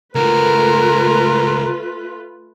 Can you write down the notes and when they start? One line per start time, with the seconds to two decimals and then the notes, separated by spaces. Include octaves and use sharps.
0.15 C#2 A3 F4 F#4 A#4 B4